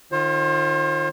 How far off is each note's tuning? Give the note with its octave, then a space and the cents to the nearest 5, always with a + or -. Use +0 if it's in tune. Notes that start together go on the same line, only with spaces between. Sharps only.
D#3 -25 F4 +0 C5 +40